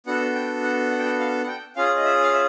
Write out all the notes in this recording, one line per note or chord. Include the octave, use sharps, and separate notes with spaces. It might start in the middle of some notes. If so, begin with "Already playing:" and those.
B3 D4 F#4 A4 F#5
G5
F#5
F#5
G5
F#5
F5
F#5
G5
C#4 F4 G#4 F5
D#5
E5
F5
E5